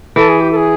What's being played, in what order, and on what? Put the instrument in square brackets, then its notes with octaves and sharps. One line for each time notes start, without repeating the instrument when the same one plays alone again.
[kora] E3 [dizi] A4
[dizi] G#4
G4
A4
G#4